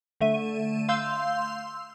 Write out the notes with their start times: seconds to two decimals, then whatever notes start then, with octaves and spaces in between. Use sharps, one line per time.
0.21 D3 A3 E5 D#7
0.89 F5 C6 E6 G6